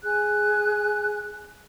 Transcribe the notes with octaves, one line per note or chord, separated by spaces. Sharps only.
G#4 G#5 F#6